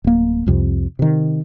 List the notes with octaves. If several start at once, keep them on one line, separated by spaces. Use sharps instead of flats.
D1 A#3
C2 F2 C3
C3 D#3